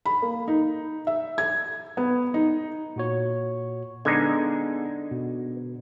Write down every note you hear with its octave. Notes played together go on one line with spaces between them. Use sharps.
B5
A#3
D#4
E5
G#6
B3
D#4
A#2 F#4 C#5
D3 G#3 B3 D#4 G#4 G#6
B2